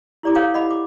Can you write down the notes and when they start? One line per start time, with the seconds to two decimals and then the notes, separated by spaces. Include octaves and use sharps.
0.23 E4 G4 D5 A#5 D6
0.35 A4 C5 C#5 F5 G5 D6
0.54 D#5 F#5 B5 D6
0.71 D6